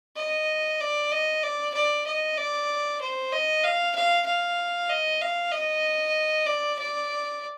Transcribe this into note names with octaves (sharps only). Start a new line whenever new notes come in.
D#5
D5
D#5
D5
D5
D#5
D5
C5
D#5
F5
F5
F5
D#5
F5
D#5
D5
D5